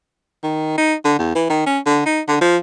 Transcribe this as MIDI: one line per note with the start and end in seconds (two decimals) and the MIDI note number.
0.43 0.76 51
0.78 0.94 63
1.05 1.16 50
1.19 1.32 40
1.35 1.45 52
1.50 1.62 51
1.66 1.79 61
1.86 2.01 50
2.06 2.21 63
2.28 2.41 50
2.41 2.57 53